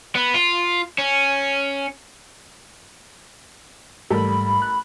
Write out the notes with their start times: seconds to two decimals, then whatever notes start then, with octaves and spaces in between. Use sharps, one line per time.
0.15 B3
0.34 F4
0.98 C#4
4.10 A1 G#2 G3 A4 A#4 B5
4.62 F#6